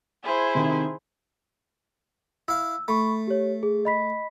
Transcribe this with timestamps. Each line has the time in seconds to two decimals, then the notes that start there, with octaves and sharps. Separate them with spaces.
0.23 E4 G#4 C5
0.55 C3 D#3
2.48 E4 F5 E6
2.88 A3 B5 C#6
3.27 G4 C#5
3.63 G#4
3.85 D#5 B5 B6